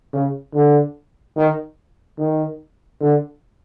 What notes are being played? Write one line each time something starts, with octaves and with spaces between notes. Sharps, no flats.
C#3
D3
D#3
D#3
D3